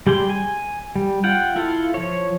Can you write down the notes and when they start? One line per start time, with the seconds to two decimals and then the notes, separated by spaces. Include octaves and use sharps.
0.07 G3 G4 G#4 C6
0.29 G#5
0.96 G3
1.24 F4 F#5 G5
1.56 E4 F4 A4
1.94 F3 C#5